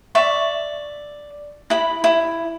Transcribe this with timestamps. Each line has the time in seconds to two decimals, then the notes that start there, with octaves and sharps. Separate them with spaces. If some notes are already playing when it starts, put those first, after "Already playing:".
0.15 D5 E5 C#6
1.70 E4 B5
2.04 E4